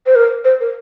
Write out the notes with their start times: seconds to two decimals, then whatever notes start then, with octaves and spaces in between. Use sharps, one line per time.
0.06 C5
0.15 A#4
0.44 C5
0.60 A#4